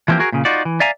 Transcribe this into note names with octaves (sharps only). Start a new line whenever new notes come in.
E3 F3 A#3 C4 G4
F#4 G#4 A#4
A#2 C#3
D#4 F4 F#4 D5
E3
D5 E5 F5 G#5 A#5